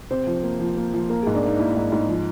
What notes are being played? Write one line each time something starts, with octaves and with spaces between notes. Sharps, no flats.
C3 C5
F3
A#3
F3
A#3
F3
A#3 A#4
G#4
G#2
D4
A#3 D#4
A#3 E4
G#2
G#2
F3